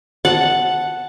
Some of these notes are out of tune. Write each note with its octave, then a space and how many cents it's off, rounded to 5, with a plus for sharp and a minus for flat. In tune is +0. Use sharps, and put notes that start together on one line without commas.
F#5 +0 A5 +0